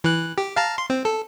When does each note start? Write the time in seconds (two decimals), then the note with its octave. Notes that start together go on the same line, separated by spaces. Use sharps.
0.04 E3 F#6
0.38 G4
0.56 F5 A5 A#5
0.78 C6
0.90 C4
1.05 A4